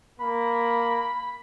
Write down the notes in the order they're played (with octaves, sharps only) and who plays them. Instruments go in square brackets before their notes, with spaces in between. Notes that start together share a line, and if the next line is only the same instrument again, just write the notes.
[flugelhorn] A#3 [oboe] B5